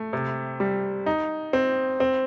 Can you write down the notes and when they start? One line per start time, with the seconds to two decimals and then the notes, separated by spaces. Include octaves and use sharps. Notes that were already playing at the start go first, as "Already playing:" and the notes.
Already playing: A3
0.13 C3
0.60 G3
1.06 D#4
1.53 C4
2.00 C4